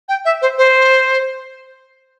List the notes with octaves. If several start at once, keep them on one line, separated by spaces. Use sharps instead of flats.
G5
E5
C5
C5